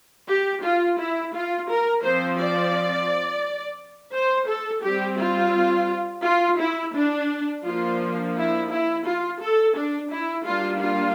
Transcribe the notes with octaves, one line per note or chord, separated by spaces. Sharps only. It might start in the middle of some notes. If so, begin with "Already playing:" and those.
G4
F4
E4
F4
A#4
F3 C4 C5
D5
C5
A4
G3 C4 G4
F4
F4
E4
D4
F3 A#3 D4 F4
E4
E4
F4
A4
D4
E4
G3 A#3 D4 F4
F4